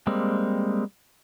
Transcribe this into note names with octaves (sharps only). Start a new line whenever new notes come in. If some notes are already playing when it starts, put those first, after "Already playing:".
G3 G#3 A#3 C4